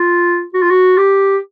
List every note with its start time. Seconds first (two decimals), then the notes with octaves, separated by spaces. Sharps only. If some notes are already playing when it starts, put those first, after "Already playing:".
Already playing: F4
0.54 F#4
0.62 F4
0.71 F#4
0.98 G4